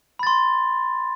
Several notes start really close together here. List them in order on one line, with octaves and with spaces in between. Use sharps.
B5 A6 C6